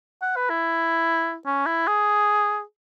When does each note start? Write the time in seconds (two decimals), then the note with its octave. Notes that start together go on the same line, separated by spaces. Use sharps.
0.22 F#5
0.36 B4
0.50 E4
1.46 C#4
1.66 E4
1.88 G#4